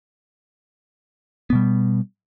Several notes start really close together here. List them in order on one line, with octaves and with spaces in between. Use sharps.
B3 B2 G3